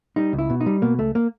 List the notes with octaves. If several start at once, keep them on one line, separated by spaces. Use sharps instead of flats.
G3 D#4
C#2
E4
B2
D#4
G3
B2 A#3
C#2 A3
A#3